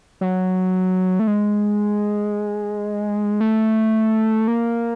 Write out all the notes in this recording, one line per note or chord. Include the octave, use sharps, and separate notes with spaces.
F#3
A3
G#3
A3
A#3